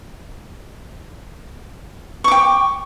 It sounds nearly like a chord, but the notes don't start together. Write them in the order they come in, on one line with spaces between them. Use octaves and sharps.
C#6 D6 G5